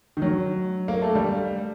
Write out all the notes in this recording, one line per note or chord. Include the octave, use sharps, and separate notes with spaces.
D#3
F#3
A#3
A3
G3